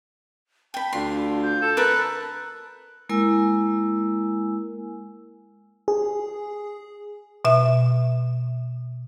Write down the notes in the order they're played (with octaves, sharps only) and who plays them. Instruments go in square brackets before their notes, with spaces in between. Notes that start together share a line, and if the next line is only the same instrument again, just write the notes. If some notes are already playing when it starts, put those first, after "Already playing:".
[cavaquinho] G5 B5 [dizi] A5
[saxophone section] D2 D4 F4 [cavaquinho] C6
[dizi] G6
[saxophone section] A4
[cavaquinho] A#4 B4 A5 [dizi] F#6
[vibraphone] G#3 A#3 E4 A#4 G#5 E6
[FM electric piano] G#4
[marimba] B2 E5